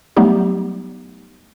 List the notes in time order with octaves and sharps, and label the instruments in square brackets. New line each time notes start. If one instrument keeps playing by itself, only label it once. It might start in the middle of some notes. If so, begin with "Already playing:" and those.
[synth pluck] F#3 G3 A3 B3 D#4 G4